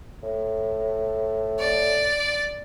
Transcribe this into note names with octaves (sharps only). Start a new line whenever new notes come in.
A2
D5